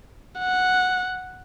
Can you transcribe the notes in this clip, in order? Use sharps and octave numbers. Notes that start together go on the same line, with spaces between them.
F#5